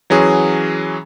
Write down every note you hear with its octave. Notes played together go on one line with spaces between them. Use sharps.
E3 F#3 C#4 G#4